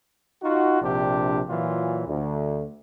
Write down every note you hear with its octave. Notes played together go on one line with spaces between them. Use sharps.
D#4 F4 F#4
A#1 C3 D4 G4
A#2 E3 F#3 F4
D2